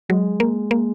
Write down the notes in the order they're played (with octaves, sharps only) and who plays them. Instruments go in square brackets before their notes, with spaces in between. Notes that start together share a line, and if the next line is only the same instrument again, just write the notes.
[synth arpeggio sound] F#3 [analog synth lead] G#3
[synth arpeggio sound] A#3
A#3